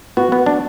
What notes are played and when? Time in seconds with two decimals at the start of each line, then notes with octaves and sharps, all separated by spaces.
0.17 B3 F#4
0.32 B3
0.46 D4